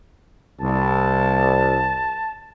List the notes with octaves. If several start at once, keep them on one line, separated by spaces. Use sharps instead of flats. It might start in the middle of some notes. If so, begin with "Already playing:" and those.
C2 A5